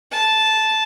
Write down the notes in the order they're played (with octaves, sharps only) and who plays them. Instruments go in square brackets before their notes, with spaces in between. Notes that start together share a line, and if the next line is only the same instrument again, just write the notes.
[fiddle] A5